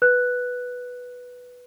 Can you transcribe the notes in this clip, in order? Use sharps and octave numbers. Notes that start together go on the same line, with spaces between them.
B4 F#6